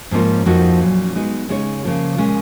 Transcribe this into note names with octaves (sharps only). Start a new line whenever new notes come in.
G#2 F3 A#3 C#4 F4
F2 F3 A#3 D#4 F#4
A#2 F#3 C#4
G#3 B3 D#4 F#4
C#3 G#3 D#4 G#4 C#5
C#3 F3 A#3 F4
A#2 G#3 C#4